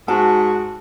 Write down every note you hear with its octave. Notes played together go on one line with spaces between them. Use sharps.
G#2 F#4 A5